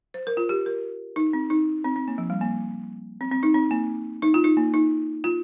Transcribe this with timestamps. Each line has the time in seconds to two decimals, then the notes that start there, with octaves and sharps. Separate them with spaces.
0.14 C5
0.27 A#4
0.37 F4
0.49 G4
0.66 A#4
1.16 D#4
1.33 C4
1.50 D#4
1.84 C4
1.96 C4
2.08 A#3
2.18 F3
2.30 G3
2.41 A#3
3.21 C4
3.32 C4
3.43 D#4
3.54 C4
3.71 A#3
4.22 D#4
4.34 F4
4.44 D#4
4.57 A#3
4.74 D#4
5.24 F4